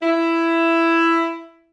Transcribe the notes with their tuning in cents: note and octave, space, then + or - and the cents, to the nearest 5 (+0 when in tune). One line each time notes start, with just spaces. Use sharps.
E4 +10